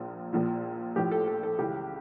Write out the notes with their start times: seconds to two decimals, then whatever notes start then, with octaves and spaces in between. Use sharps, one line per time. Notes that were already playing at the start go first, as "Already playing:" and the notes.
Already playing: A#1 A#2 F3
0.33 A#1 A#2 F3
0.96 A#1 A2 F3 G4
1.11 A4
1.27 A4
1.43 A4
1.59 C#2 C#3 E3 G4